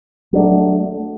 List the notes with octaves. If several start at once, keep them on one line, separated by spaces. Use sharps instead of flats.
F#3 A3 D4